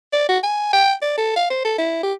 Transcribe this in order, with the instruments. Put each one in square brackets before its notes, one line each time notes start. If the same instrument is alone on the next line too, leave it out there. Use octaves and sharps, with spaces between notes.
[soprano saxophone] D5
F#4
G#5
G5
D5
A4
F5
C5
A4
E4
G4